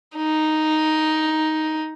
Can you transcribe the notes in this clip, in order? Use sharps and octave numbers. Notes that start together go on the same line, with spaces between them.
D#4